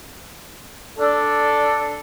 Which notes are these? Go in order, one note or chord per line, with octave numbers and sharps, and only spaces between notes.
D4 A4